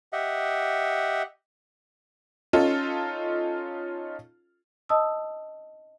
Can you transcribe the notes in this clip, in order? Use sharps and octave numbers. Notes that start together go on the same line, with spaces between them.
G4 D#5 E5 F#5
C#4 D#4 F4 A4
D#5 A5 D#6 E6